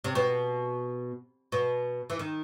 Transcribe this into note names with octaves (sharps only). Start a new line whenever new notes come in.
C3
B2
B2
E3
D#3